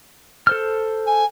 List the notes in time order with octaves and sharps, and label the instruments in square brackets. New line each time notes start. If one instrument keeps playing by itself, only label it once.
[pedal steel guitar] A4 C5 F6
[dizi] G#5